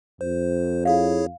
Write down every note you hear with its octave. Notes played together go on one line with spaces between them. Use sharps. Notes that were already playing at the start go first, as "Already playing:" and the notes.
F2 C5
E4 G#4 C#5 F5